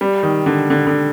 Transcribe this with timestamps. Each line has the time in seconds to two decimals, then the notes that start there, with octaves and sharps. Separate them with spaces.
0.01 G3
0.23 D#3
0.46 D3
0.70 D3
0.87 D3